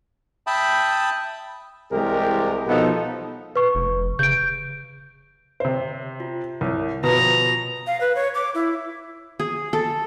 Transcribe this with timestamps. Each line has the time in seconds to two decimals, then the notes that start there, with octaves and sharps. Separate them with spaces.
0.47 E5 G5 A5 B5 D#6
1.92 C2 E3 G#3 G4 A#4
2.67 B1 B2 F3 B3 D#4 A4
3.55 B4 C#6
3.75 F1
4.19 C#3 G6 D7
5.60 C3 C5
6.20 F4
6.61 C2 A#4 C#5
7.03 B2 F3 B4 A#5
7.87 F5
8.01 B4
8.15 C#5
8.35 D6
8.55 E4
9.40 G#4
9.73 A4